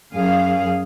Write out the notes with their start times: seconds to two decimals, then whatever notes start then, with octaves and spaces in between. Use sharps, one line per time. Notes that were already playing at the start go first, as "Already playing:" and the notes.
0.13 F#2 G#4 F5